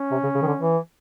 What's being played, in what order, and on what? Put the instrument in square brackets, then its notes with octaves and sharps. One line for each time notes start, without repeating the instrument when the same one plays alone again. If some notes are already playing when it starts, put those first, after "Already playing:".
Already playing: [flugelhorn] C#4
[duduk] C3
C#3
C#3
D#3
D3
E3